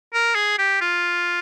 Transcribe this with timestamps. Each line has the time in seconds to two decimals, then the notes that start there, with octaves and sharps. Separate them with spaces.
0.13 A#4
0.35 G#4
0.58 G4
0.81 F4